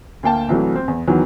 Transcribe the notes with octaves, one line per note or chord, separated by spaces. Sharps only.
D2 A#3 G5 A5
C2 E3 F#3 A3
C4
E2
E2 D#3 E3 F#3